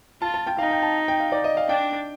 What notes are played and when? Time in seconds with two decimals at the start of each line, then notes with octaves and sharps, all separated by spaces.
0.22 F4 A5
0.34 A5
0.47 G5
0.58 D#4 F5
0.71 G5
0.83 A5
1.08 G5
1.20 F5
1.32 D5
1.44 D#5
1.57 F5
1.69 D4 G5